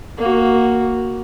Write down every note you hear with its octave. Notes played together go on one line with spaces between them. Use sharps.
A#3 F#4